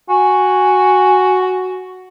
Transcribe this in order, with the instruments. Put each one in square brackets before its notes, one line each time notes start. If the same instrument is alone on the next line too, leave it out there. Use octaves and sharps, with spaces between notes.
[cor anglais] F#4 [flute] G#5